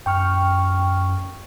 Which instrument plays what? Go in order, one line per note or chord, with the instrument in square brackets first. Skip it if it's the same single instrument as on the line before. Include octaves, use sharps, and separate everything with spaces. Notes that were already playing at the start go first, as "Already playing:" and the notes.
[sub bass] F#2 [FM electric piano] G5 C#6 F6